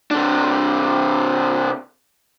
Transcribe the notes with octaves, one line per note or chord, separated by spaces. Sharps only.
C3 D4